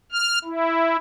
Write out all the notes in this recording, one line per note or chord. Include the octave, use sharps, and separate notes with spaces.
F6
E4